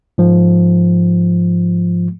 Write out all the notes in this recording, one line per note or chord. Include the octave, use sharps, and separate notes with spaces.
G#2 F3